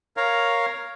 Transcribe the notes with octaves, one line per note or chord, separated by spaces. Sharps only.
A#4 C#5 F5